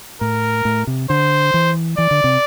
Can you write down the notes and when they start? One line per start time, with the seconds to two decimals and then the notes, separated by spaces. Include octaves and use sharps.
0.21 A2 A#4
0.65 A2
0.87 C3
1.10 D3 C5
1.54 E3
1.98 E3 D5
2.11 D3
2.24 C3